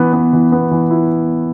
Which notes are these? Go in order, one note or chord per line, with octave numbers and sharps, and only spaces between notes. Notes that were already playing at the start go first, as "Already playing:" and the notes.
Already playing: E3 B3
B3
E3
B3
E3
E4